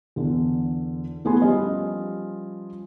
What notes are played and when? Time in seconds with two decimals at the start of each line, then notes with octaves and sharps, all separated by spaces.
0.16 E2 D3
1.25 E3 A3 B3 G#4 G#5 C6
1.42 F3 G3 C#4 F4 G4 D#5